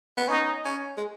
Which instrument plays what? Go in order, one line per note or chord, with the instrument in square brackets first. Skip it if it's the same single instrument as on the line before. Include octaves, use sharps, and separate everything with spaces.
[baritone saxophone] B3
[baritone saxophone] C#4 [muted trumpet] D#4
[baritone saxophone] C#4
G#3